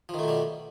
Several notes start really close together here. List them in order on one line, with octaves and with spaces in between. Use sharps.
F3 D#3 A3 B2 G3